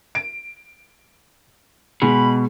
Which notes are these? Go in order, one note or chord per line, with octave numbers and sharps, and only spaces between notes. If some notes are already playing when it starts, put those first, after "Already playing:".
D7
B2 G#3 B5